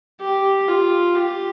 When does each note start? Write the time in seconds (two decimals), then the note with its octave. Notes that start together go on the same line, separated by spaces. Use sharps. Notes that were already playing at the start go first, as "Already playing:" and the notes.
0.21 G4
0.68 F4
1.15 G4